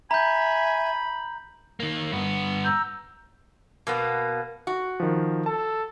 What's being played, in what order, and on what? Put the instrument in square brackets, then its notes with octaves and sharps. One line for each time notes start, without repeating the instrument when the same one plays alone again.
[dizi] E5 [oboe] G#5 [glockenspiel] A#5 G6 [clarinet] B5
[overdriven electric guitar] D#3 A#3
G2 B3
[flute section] A#5 E6 G6
[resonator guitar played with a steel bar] B2 A#3 B3
F#4
[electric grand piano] D#3 F3
[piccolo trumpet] A4 [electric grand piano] A5